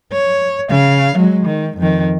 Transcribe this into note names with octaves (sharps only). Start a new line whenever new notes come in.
C#5
C#3 F5
F#3 G#3
D#3
F2 D#3